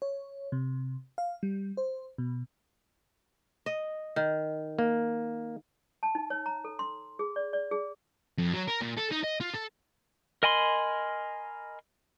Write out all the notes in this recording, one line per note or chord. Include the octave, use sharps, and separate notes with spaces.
C#5
C3
F5
G3
C5
B2
D#5
D#3
A#3
A5
D#4
C#5
A#5
A4
C6
G#4
D5
D5
G#4
F2
F#3
A#4
A#2
A4
D#4
D#5
F4
A4
A#4 D#5 G#5 B5 C6